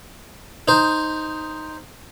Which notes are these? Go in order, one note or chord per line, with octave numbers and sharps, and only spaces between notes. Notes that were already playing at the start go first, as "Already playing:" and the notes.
D#4 C5